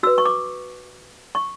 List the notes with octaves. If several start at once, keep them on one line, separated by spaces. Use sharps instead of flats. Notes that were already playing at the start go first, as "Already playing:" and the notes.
F#4 B4 E6
C#6
D6
C#6